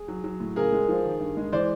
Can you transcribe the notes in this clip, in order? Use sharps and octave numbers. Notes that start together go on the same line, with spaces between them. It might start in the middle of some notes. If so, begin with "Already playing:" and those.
Already playing: G#4
F#3
F#3
A2
C#3 G#4 A#4
G#3
F3
D#3
G2
G#3
E3 C5 D5